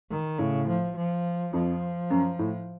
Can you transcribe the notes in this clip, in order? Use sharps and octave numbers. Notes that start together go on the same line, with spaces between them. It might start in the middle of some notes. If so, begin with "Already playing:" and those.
D#3
A2 C#3
F3
F3
F2 F3
F#2
A2